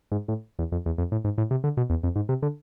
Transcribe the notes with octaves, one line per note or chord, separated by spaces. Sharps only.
G#2
A2
E2
F2
E2
F2
A2
G#2
A2
C3
D3
B2
E2
F2
G#2
C3
D3